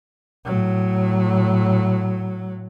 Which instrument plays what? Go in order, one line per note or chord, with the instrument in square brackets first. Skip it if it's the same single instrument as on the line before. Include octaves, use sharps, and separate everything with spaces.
[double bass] A2 F#3